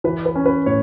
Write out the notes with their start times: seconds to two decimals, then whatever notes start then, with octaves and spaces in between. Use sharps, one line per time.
0.04 E3 B4
0.26 B4
0.35 C#4
0.46 B4
0.66 A2 C#5